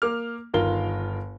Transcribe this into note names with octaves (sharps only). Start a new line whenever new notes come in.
A#3 D6 F6
G1 D#3 F4 A#4 F5 G7